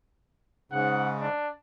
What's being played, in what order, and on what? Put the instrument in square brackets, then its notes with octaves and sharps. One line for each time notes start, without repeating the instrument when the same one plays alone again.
[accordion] G#2 C#3 [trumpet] F#5
[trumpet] D4